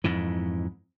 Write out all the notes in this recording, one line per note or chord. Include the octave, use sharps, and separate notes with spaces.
F2 G#2 E3